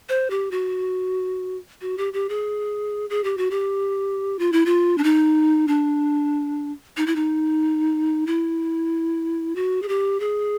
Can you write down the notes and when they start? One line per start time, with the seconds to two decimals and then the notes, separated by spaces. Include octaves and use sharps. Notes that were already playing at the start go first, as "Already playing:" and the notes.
0.09 C5
0.30 G4
0.51 F#4
1.81 F#4
1.98 G4
2.13 G4
2.29 G#4
3.10 G#4
3.24 G4
3.37 F#4
3.51 G4
4.39 F4
4.52 E4
4.66 F4
4.98 D4
5.04 D#4
5.68 D4
6.97 D#4
7.07 E4
7.16 D#4
8.27 E4
9.56 F#4
9.82 G#4
9.88 G4
10.20 G#4